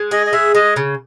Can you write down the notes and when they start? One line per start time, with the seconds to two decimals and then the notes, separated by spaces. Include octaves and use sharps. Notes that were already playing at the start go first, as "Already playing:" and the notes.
Already playing: G#3
0.11 G#4 D#5
0.27 D#5
0.33 G#3 E5
0.55 G#3 D#5
0.76 C#3